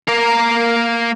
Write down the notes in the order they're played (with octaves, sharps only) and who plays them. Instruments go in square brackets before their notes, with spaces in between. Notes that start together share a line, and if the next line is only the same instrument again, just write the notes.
[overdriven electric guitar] A#3 A#4